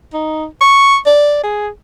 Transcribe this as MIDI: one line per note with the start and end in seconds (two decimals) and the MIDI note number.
0.13 0.46 63
0.61 0.97 85
1.07 1.43 74
1.43 1.68 68